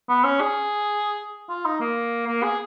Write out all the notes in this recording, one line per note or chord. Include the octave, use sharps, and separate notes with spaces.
B3
C#4
G#4
F4
D#4
A#3
A#3
G#4